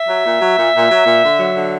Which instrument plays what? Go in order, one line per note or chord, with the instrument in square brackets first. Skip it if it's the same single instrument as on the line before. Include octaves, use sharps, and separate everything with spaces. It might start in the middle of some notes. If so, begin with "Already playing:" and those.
Already playing: [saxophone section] E5
F#3
A#2
F#3
A#2
A#2
F#3
A#2
D3
F#3
D3